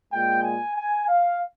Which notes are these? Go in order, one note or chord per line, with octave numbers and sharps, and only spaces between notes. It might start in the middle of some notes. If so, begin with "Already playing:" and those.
A#2 G#3 G5
G#5
G#5
F5